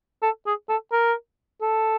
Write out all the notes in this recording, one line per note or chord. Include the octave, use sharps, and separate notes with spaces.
A4
G#4
A4
A#4
A4